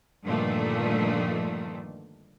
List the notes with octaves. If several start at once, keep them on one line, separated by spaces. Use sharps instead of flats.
G2 A#2 D3 D#3 F3 A3